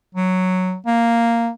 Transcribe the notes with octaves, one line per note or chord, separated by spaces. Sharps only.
F#3
A#3